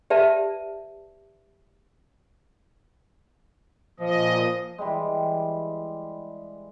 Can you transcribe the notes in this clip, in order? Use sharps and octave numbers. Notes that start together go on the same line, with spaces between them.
G4 B4 D5 E5 A5
A#2 F3 D#5
E3 G3 G#3